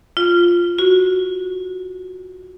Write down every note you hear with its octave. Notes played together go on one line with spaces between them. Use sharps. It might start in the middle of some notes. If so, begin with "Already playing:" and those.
F4
F#4